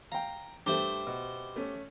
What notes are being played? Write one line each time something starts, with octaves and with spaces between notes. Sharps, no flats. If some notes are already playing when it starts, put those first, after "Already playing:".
F5 G5 A#5
G2 A3 G4 C5 E5
B2
A3 C#4